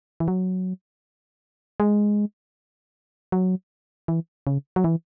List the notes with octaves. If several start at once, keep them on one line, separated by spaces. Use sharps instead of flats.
E3
F#3
G#3
F#3
E3
C#3
F#3
E3